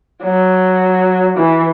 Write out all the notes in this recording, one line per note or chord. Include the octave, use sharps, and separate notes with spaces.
F#3
E3